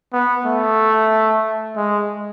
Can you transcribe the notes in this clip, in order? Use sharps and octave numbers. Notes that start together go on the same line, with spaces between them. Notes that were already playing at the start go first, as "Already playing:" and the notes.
B3
A3
G#3